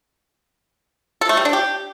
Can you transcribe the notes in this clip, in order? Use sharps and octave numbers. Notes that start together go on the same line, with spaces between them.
A4
A3
G3
D4
G4